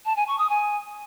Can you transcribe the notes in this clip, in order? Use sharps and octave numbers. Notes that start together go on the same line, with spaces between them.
A5
G#5
C#6
D#6
G#5